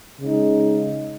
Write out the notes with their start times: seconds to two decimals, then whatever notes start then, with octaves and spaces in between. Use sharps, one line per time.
0.21 C#3 G#3 D#4